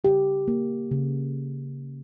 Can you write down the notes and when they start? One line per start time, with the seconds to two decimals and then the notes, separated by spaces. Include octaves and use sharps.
0.04 C#3 G4
0.48 A#3
0.91 C#3